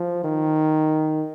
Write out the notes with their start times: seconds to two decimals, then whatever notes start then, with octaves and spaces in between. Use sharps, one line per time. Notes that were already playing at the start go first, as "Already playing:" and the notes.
Already playing: F3
0.24 D#3